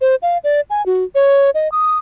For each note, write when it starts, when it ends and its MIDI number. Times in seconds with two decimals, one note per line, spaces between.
0.01 0.15 72
0.22 0.38 77
0.44 0.61 74
0.70 0.84 80
0.86 1.04 66
1.15 1.50 73
1.54 1.71 75
1.72 1.98 87